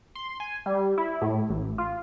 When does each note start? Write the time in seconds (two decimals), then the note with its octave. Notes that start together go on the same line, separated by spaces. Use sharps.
0.15 C6
0.40 G#5
0.66 G3
0.98 E4
1.22 A2
1.49 A1
1.78 F4